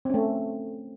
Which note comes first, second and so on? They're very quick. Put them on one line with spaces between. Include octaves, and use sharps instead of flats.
C4 C#4 A3